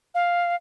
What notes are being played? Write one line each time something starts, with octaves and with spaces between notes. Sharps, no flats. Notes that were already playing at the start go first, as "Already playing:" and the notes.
F5